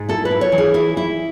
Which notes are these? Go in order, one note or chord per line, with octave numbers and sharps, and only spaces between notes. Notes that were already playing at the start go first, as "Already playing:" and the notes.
Already playing: G#2
E4 A4
B4
E4
C#5
E3
G#4
E4 G#4
E4